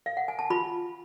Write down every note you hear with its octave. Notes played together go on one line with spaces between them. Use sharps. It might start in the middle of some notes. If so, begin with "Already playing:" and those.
F5
F#5
G#5
A5
F4 B5